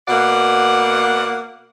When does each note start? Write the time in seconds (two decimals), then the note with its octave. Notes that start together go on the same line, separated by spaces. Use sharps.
0.08 B2 A#3 D5 F#5